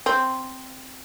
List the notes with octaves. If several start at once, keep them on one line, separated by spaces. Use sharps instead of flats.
C4